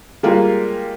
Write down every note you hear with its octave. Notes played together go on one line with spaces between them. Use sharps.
G3 G#3 A#3 F4